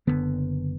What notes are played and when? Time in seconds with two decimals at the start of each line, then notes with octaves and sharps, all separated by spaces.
0.07 F#1 F#2 D3 B3